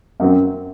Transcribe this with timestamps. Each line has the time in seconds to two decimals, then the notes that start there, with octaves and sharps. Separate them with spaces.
0.20 F#2 F#3 C4